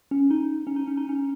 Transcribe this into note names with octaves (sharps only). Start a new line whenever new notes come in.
C#4
D#4
C#4
D#4
C#4
D#4
C#4